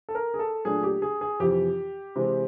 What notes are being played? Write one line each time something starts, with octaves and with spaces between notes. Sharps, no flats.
A4
A#4
G#4
A4
A#2 F#3 A3 D4 G#4
G4
G#4
G#4
F2 C3 E3 G4
C3 E3 G#3 C4